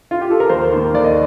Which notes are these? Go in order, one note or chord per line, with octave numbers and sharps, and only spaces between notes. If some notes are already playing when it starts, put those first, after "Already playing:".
F4
G4
A4
A#4
D#2 C5
D#3 A#3
D#2 D5
D#5